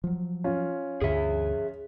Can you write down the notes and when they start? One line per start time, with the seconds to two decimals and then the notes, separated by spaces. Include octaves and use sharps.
0.04 F3 F#3
0.44 C#4 F4
1.02 D2 G2 D3 G#4 E5